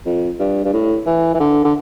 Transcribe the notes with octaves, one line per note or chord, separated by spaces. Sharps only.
F2
G2
G2
A2
E3
E3
D3
D3